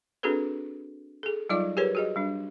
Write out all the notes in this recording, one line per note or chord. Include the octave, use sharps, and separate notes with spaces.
C4 D4 F#4 G#4 A4 B4
G#4 A4
F#3 G3 D#4 F4 D5 D6
G4 G#4 A#4 B4 C#5
F#4 G#4 D#5
G3 D4